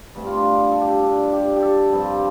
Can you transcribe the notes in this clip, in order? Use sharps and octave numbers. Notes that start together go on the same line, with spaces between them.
G2 D3 A3 C4
F4
D4
A4
A4
G4
D4
G4
G4
A4
G2 F3 C4 A5